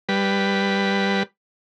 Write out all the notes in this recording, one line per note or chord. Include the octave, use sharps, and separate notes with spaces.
G3 B4